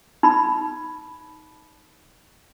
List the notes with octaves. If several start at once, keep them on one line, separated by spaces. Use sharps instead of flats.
D#4 B5